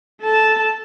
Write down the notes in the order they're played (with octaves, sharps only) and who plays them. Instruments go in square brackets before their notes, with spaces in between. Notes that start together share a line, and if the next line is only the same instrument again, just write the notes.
[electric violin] A4 A5